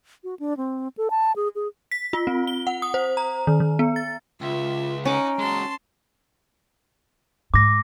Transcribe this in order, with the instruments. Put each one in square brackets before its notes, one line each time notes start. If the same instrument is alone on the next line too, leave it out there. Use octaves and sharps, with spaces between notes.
[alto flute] F#4
D4
C4
A4
A5
G#4
G#4
[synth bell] B6
F4
C4
G7
F#5
D#6
C5
A#5
D#3
D#3
B3
A6
[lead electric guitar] C#2 [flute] F4 [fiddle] E5
[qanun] C#4 D6 [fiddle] D#4 F#5 [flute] A#5
[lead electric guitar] G#3 F#4 [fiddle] A5 C6
[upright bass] G#2 [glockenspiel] D6 A#6